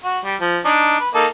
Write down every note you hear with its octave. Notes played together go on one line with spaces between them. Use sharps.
F#4
G3
F3
D4 D#4
B4
A#3 D#4 A4